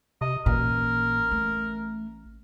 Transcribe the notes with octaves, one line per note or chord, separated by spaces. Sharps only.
C3 D#5
A1 A#2 A#4
A3